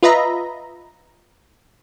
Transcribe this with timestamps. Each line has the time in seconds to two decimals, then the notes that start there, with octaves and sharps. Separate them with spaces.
0.03 F4 B4 D#5 E5 A#5 B5